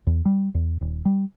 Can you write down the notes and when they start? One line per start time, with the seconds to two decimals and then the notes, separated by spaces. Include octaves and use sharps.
0.07 E2
0.25 G3
0.55 E2
0.81 D#1
1.05 G3